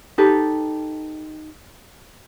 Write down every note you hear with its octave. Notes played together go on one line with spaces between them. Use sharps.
D#4 G4 A4 B4